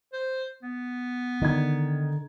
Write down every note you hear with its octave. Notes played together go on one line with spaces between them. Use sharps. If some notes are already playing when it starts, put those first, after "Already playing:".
C5
B3
D3 D#3 G#6